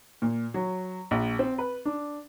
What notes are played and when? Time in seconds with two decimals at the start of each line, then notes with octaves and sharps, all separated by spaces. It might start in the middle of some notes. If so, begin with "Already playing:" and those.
0.22 A#2
0.54 F#3
1.11 A#1
1.39 C4
1.58 B4
1.85 D4